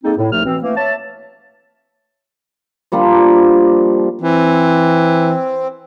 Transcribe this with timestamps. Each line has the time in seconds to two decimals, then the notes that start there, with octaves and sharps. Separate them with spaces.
0.04 G#3 A#3 C4 D#4 A4
0.17 A2
0.32 C2 F3 A3 D#4 F6
0.45 B2 E3 C4
0.62 E3 A3 A#3
0.77 C#5 E5 A5
2.92 F3 G3 A#3 D4
4.20 E3 C4